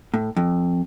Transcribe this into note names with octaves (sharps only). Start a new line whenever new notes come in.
A2
F2